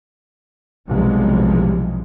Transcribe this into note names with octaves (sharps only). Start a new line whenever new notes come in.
B1 E2 C3 F3 G3 G#3